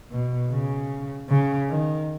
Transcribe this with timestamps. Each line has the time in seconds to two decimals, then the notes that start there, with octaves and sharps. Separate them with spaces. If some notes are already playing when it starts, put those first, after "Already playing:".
0.11 B2
0.51 C#3
1.30 C#3
1.70 D#3